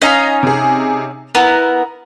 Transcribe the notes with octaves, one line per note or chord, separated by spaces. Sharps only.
C#4 D#4 D#5 F5 G#5 B6
C3 G#4
B3 E4 A#4 A#5